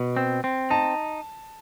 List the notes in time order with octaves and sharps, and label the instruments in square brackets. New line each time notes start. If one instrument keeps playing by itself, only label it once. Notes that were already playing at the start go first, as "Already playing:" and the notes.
Already playing: [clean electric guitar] B2
C4
C4
[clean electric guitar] D#4 [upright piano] A5